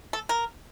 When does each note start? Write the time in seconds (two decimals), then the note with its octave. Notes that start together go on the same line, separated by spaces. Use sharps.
0.13 A4
0.29 A#4